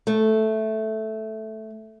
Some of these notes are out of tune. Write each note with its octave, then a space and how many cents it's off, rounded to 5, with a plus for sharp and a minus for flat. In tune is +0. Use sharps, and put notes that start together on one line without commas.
A3 -5